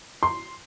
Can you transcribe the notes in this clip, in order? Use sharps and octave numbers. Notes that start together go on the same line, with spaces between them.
C6